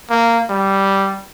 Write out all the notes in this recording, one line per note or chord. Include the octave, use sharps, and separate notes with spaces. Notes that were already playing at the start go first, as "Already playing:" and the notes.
A#3
G3